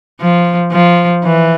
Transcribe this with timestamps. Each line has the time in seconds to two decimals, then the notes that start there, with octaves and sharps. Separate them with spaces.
0.21 F3
0.72 F3
1.24 E3